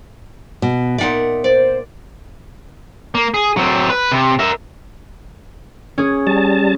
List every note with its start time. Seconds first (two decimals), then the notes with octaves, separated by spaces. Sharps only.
0.62 B2
0.98 A#2 D#4 D5 E5 F#5
1.44 C5 D5
3.15 A#3
3.34 G#4
3.57 F#3 C4
3.90 B4
4.12 C3
4.39 A#4 E5
5.98 C#4 G#4
6.27 G3 A5